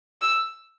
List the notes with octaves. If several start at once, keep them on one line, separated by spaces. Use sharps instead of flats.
E6